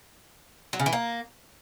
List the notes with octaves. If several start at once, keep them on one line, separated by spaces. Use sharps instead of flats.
F#3
C#3
E3
A#3